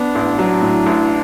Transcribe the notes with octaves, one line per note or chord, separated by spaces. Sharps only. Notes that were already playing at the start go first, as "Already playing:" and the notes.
Already playing: B3 D4
A1
F#3
A2
A1